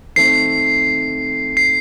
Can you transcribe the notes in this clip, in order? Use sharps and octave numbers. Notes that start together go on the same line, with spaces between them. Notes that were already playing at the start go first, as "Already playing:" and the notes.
D#3 A3 C4 C7
C7